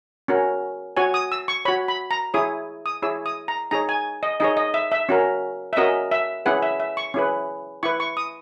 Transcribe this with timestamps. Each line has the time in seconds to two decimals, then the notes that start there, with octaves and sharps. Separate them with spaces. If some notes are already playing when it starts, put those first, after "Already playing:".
0.28 C#4 F#4 A#4
0.97 F#4 C#5 G#5
1.14 D#6
1.32 E6
1.48 C#6
1.65 C#5 B5
1.68 F#4
1.88 B5
2.11 A#5
2.34 E4 G#4 C#5 D#6
2.86 D#6
3.02 E4 G#4 C#5 E6
3.26 D#6
3.48 A#5
3.71 D#4 G#4 C#5 A#5
3.89 G#5
4.23 D#5
4.40 D#4 G#4 C#5 D#5
4.57 D#5
4.74 E5
4.92 E5
5.09 C#4 F#4 A#4
5.73 E5
5.77 C#4 F#4 A#4 D#5
6.11 E5
6.46 C#4 E4 G#4 B4 F#5
6.62 E5
6.80 E5
6.97 C#6
7.14 C#4 E4 G#4 B4
7.83 E4 B4 C#6
8.00 C#6
8.17 D#6